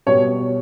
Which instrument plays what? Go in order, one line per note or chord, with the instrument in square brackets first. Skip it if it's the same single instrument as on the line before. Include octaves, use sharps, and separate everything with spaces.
[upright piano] B2 G3 C#5